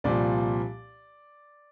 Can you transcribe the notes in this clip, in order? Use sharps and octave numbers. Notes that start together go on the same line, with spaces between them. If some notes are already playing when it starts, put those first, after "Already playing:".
C2 A#2 F3 D5